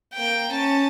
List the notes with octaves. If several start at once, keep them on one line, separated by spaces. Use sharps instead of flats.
A#3 G5
C#4 A5